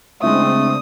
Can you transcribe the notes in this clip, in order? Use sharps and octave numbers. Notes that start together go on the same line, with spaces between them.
C#3 G#3 A3 C4 D4 E4 D#6